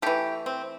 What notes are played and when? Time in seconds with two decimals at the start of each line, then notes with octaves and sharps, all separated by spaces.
0.02 E3 A3 G4
0.46 C4